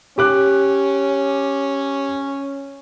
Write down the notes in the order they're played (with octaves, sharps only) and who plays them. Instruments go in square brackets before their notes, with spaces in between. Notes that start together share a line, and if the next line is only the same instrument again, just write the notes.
[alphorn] C#4 [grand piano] G4 D6 F#6